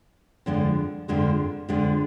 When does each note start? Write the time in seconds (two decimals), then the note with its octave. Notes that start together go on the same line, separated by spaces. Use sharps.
0.46 F2 D3 F3 G#3
1.08 F2 D3 F3 G#3
1.69 F2 D3 F3 G#3